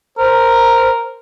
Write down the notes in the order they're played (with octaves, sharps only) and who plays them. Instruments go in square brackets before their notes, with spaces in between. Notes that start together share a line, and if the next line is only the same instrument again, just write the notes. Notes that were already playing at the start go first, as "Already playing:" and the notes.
[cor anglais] A#4 [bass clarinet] C5